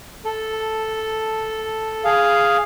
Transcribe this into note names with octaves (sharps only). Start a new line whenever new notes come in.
A4
G#4 F5